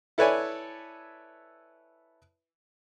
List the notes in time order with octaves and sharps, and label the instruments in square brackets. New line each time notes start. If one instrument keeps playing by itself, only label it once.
[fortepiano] E4 A4 B4 C#5 D5 G#5